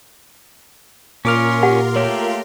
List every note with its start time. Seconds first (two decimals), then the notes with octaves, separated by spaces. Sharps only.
1.25 A#2 C#4 F4 A#4 C6 D6 F6
1.63 G4 F#5
1.96 A3 A#3 G4 C#5